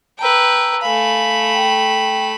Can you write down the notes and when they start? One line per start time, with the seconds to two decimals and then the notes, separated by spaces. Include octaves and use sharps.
0.19 B4 G5 A5 A#5 E6
0.81 A3 F5 G#5 B5
1.54 G5